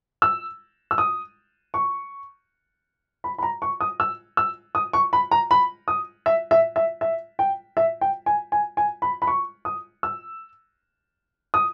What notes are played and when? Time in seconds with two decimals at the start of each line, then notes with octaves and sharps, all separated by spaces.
0.22 E6
0.91 E6
0.98 D#6
1.74 C#6
3.24 B5
3.38 B5
3.43 A#5
3.62 C#6
3.81 D#6
4.00 E6
4.37 E6
4.75 D#6
4.93 C#6
5.13 B5
5.31 A#5
5.51 B5
5.88 D#6
6.26 E5
6.51 E5
6.76 E5
7.01 E5
7.39 G5
7.77 E5
8.01 G5
8.26 G#5
8.52 G#5
8.77 G#5
9.02 B5
9.22 B5
9.27 C#6
9.65 D#6
10.03 E6
11.54 D#6